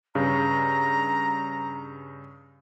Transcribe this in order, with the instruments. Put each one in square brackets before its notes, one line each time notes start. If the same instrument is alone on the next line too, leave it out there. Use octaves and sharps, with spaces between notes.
[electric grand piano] G2 C#3 [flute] A#5